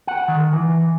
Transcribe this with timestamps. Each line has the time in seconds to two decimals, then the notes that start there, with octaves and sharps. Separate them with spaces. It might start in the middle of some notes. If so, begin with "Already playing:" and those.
0.07 F#5
0.28 D#3
0.53 E3